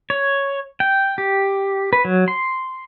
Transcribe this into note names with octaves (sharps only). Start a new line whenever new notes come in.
C#5
G5
G4
B4
F#3
C6